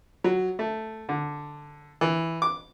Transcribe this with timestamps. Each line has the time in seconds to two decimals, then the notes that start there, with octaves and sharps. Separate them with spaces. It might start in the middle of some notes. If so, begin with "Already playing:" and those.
0.24 F#3
0.59 A3
1.09 D3
2.01 E3
2.42 D6